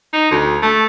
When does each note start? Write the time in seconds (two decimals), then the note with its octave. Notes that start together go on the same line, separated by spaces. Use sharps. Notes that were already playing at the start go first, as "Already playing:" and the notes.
0.13 D#4
0.31 D2
0.62 A3